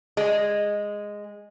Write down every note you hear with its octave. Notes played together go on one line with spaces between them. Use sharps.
G#3